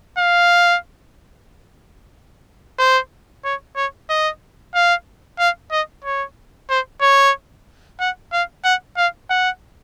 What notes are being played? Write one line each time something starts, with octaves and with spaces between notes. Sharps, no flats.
F5
C5
C#5
C#5
D#5
F5
F5
D#5
C#5
C5
C#5
F#5
F5
F#5
F5
F#5